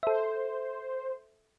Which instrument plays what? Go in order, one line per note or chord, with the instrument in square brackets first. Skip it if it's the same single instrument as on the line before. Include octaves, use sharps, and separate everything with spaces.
[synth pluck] A4 E5 [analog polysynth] C5